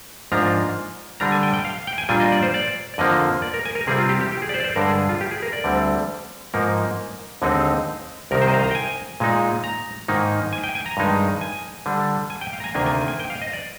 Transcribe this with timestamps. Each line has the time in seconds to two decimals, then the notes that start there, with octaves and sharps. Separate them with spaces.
0.32 G#2 F3 A#3 D4 F4 A#5
1.20 D3 G3 D4 A#5
1.32 G#5
1.43 G5
1.54 G5
1.65 F5
1.87 G5
1.98 G#5
2.09 A#2 G3 D4 F4 G#5
2.20 D#5
2.32 D5
2.43 C5
2.54 D5
2.94 D5
2.98 F2 D3 F3 A#3 D#5
3.42 D5
3.54 A#4
3.65 G#5
3.75 A#4
3.87 C3 G3 C4 F4 G#4
3.98 F4
4.09 G4
4.21 G4
4.32 G4
4.42 G#4
4.49 D5
4.54 C5
4.60 D5
4.64 C5
4.76 G2 D3 G#3 D4 A#4
4.87 G#4
5.09 F4
5.21 G4
5.31 G#4
5.43 A#4
5.53 D5
5.64 D2 D3 G3 C4
6.54 G#2 F3 A#3 D#4 A#4
7.42 D#2 D3 G#3 C4 D#4
8.31 C2 C3 D#3 A#4
8.42 C5
8.48 D#5
8.54 F5
8.64 A#5
8.71 G5
8.75 G#5
9.20 A#2 G#3 D#4
9.64 A#5
10.08 G#2 D#3 A#3 D#4
10.53 G#5
10.64 G5
10.75 G#5
10.86 A#5
10.97 G2 D#3 G#3 D#4
11.41 G#5
11.86 D3 G3 D4
12.30 G#5
12.41 G5
12.53 F5
12.60 A#5
12.64 G#5
12.74 D2 C3 D#3 A#3 D4 G#5
12.86 G#5
13.08 G#5
13.20 G5
13.30 F5
13.42 D#5
13.53 D5